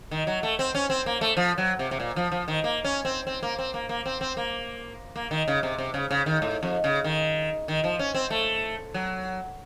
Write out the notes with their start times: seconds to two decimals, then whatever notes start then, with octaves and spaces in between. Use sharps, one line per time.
0.11 D#3
0.27 F#3
0.43 A3
0.59 C4
0.75 C#4
0.90 C4
1.06 A#3
1.21 A3
1.37 F3
1.58 F#3
1.79 C3
1.91 C3
2.00 A#2
2.16 F3
2.32 F3
2.48 D#3
2.64 A#3
2.84 C#4
3.05 C4
3.27 C4
3.43 A#3
3.59 C4
3.74 A#3
3.89 A#3
4.06 C4
4.21 C4
4.37 A#3
5.16 A#3
5.31 D#3
5.48 C#3
5.63 C3
5.78 C3
5.94 C#3
6.11 C#3
6.26 D#3
6.42 A2
6.63 F2
6.84 C#3
7.04 D#3
7.68 D#3
7.84 F3
7.99 C#4
8.14 C4
8.30 A3
8.94 F#3